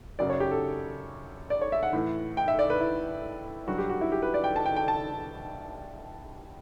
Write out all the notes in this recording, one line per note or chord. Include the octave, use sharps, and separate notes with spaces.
F#2 C#3 F#3 D5
C#5
G4
A4
D5
C#5
E5
F#5
A2 E3
G5
E5
D5
B4
E4
G2 F#3 F#4
G4
F#4
E4
G4
B4
D5
G5
A5
G5
G5
A5